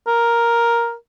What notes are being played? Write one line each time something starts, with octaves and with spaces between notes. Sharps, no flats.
A#4